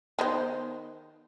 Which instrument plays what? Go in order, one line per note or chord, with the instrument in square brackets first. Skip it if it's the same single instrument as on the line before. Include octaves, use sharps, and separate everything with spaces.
[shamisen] D#3 B3 C5